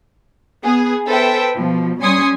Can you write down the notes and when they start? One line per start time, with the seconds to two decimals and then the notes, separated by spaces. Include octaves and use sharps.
0.64 B3 G#4
1.07 A4 B4 C5 E5 G5
1.54 B2 F3
2.00 G3 C#4 G#5 C6 D#6 C#7